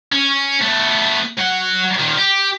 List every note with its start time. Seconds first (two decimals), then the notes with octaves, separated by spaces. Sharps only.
0.12 C#4
0.61 A3 B3
1.37 F#3 F#5
1.99 A#2 D#3
2.18 G4